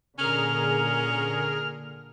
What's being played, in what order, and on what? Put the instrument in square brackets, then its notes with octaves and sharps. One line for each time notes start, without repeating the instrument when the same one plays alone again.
[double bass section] A#2 D3 [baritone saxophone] C#4 [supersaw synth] G#4 A#4 [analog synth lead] F6